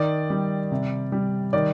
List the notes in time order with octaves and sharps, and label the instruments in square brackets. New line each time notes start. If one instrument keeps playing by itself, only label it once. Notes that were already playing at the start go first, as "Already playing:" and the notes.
Already playing: [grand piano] D#3 D5
G3
C3
G3
D#3 D5